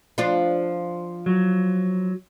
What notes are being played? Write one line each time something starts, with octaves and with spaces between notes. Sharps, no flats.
F3 D4 F4
F#3